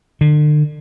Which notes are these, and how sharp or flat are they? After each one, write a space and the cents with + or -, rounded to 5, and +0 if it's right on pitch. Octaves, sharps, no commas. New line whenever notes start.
D3 +35